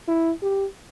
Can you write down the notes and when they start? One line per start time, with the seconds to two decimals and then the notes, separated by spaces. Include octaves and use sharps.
0.08 E4
0.42 G4